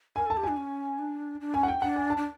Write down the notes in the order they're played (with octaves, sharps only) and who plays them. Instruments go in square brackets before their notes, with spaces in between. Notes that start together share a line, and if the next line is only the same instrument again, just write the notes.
[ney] A#4 [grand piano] G#5
[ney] A4 [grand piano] A5
[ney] G4
[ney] D4 [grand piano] G#5
[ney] C#4
D4
D4
[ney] C#4 [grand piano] G#5
[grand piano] F#5
G5
[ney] D4 [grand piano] F#5
[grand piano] G#5
A5
[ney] D4